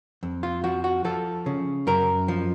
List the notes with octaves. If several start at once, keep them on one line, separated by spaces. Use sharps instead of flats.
F2
F4
F3 F#4
F#4
F3 A4
C#3
F#2 A#4
F3